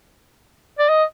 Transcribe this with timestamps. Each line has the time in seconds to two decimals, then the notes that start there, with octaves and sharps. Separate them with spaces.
0.79 D5
0.89 D#5